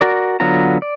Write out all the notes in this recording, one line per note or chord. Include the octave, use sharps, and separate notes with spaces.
F#4 A#4 D5
D3 F#3 B3 F4 A#5
D5